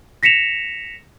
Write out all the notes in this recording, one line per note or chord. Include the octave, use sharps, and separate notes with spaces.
A#6 B6 C#7 E7 F7